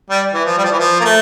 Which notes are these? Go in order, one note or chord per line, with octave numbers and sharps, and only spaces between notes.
G3
E3
F3
G3
F3
E3
F3
A#3
A3